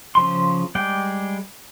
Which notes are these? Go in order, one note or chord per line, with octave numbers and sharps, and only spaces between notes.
C#3 F3 C6
G3 G#3 G#4 D5 G5